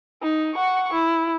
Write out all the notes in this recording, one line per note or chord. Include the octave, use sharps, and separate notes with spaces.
D#4
F#5 C#6
E4